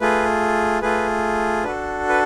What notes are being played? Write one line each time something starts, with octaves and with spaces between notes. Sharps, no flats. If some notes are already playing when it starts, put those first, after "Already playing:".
A3 F4 G#4 B4
A3 F4 G#4 B4
D4 F#4 A4 B4
B4